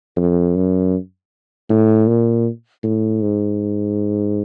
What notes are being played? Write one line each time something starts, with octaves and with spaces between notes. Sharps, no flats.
F2
F#2
A2
A#2
A2
G#2